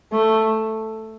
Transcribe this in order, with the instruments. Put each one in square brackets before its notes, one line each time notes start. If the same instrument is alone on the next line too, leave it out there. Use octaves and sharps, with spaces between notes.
[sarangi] A3